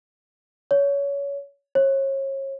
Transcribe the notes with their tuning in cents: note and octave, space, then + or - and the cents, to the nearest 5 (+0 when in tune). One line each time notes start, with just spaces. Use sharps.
C#5 +25
C#5 -35